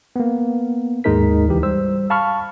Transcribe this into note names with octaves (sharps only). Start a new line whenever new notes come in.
A#3 B3
D#2 G#2 G#3 D#4 A#4 B6
C#2 E3 G4
G3 C5 E6
F5 A5 B5 C#6 F6